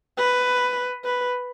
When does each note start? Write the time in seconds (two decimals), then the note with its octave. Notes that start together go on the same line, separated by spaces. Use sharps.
0.18 B4
1.05 B4